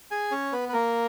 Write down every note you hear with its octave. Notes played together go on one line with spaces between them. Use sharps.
G#4 G#5
C#4 C#5
B3 B4
B4
A#3 A#4